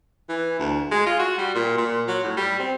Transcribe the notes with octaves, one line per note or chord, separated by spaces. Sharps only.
E3
D2
G#3
F4
F#4
G3
A#2
A#2
F#3
A2
G3
C4